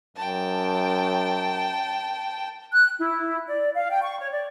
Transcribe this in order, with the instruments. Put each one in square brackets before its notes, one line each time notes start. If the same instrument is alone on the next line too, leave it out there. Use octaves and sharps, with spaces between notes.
[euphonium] F#2 [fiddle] G5 A5
[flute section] F#6
E4
D5
F5
G5
C#6
C#5
D5